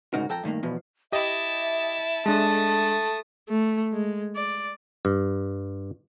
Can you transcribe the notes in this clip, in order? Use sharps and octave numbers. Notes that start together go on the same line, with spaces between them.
D2 G#2 C#3 D#4 F#4 A#4
F2 A4 G5 A#5
G2 D#3 A3 A#3
E2 B2 F3
E4 G4 D#5 E5 A5
G#3 A3 D4 A5 D#6
A3
G#3
D5
G2